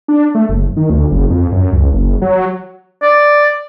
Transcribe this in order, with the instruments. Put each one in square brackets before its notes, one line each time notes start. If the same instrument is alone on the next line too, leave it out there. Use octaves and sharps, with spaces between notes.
[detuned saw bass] D4
A3
F#1
D#3
D2
F#1
F2
F#2
C#2
F#1
F#3
[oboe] D5